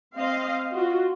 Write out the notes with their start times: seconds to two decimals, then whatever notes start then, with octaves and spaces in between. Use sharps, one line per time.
0.17 C4 D#5 F5
0.74 F4 F#4